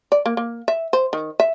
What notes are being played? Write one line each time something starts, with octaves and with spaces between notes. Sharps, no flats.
D5
A#3
A#3
E5
C5
D#3
E5